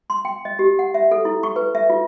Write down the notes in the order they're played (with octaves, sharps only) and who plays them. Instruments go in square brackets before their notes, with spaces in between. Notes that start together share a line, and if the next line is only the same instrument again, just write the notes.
[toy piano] C6
G5
D#5
G4
F#5
E5
A4
E4
C#6
B4
E5
F4